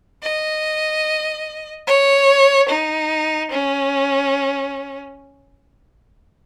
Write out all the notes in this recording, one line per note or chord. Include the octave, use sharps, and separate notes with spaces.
D#5
C#5
D#4
C#4